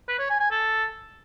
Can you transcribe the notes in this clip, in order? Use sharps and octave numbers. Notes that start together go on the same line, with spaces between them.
B4
C#5
G#5
G#5
A4